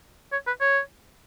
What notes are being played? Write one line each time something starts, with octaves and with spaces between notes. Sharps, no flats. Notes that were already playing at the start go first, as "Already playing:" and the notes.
C#5
B4
C#5